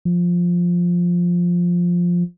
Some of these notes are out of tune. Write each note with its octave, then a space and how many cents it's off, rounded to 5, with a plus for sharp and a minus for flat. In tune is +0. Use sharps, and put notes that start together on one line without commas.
F3 +5